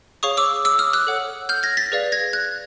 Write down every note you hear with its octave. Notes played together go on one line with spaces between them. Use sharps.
G#4 C#5 F5 C#6 D#6
D6 E6
D6 E6
D#6 F6
E6 F#6
A4 C#5 F#5
F6 G6
G#6 A#6
A6 B6
G#4 B4 D5 F5
G#6 A#6
F#6 G#6